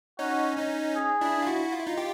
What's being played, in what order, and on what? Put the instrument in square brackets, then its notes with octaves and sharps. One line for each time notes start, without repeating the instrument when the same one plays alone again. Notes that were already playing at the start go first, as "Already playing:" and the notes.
[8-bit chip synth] C#4 D#4 [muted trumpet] F#4
[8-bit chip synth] C#4 D#4
[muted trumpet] G#4
[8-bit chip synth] D4 E4
F4
E4 F#4
F4
E4
D#4 F4
F4 G4